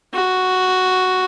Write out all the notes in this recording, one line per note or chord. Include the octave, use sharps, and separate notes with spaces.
F#4